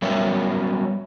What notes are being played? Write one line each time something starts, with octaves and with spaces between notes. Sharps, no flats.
F#3 G3 B3 C#4 A#4 E5